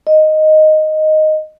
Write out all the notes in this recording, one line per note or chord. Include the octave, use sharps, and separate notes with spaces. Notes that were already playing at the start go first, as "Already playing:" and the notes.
D#5